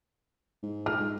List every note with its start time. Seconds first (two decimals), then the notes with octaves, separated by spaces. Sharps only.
0.63 G#2
0.86 F6
1.00 G#2